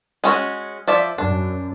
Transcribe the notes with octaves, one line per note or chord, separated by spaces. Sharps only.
G#3 C#4 F#4
F3 D5 E5
F#2 D4